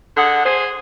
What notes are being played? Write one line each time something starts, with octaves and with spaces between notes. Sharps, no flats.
D3 G#4 F#5
G#4 C5